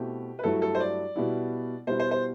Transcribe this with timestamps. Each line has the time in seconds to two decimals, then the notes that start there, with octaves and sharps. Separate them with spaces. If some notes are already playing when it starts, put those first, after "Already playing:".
Already playing: B2 A3 C4 E4 G4
0.39 B4
0.43 G2 F#3 A3 E4 A4
0.62 A4
0.75 C5
0.80 D5
1.16 B2 G3 B3 E4
1.87 B2 G3 B3 E4 C5
2.00 C5
2.11 C5